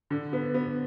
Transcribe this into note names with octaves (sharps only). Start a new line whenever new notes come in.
D3
B3
B3